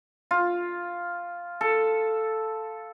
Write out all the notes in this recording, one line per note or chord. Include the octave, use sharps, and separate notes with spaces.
F4
A4